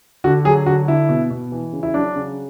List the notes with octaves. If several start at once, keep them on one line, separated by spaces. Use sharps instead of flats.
D3 F#4
F#3 G#4
D3 F#4
D3 E4
B2
B2
E3
C#3
E4
F#3 D4
C#3